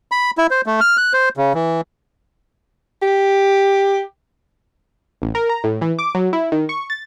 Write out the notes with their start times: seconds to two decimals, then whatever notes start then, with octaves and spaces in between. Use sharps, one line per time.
0.12 B5
0.38 E4
0.51 C5
0.66 A3
0.81 F6
0.97 F#6
1.13 C5
1.37 C#3
1.55 E3
3.02 G4
5.22 A1
5.35 A#4
5.49 A#5
5.64 A2
5.81 E3
5.99 D6
6.15 F#3
6.33 E4
6.52 D#3
6.69 C#6
6.90 A6